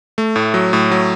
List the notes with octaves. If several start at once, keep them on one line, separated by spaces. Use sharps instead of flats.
A3
A2
F#3
A2
F#3